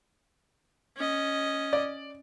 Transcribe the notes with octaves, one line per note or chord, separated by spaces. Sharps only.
C#4 D#5
D5